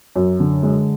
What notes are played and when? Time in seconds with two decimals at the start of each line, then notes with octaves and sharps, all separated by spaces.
0.16 F#2
0.40 D3
0.63 G#3